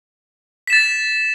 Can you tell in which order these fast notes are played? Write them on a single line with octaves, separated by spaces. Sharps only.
B6 E7 A6